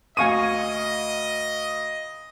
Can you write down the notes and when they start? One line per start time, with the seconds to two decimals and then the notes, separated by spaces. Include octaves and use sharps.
0.17 D2 D#5 F5 G#5 C#6 D#6 D#7